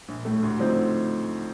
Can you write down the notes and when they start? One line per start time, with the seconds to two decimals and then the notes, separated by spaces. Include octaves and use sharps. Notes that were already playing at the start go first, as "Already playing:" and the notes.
0.08 A#1
0.25 A2 A3
0.43 D2
0.59 D3 F3 C4 D#4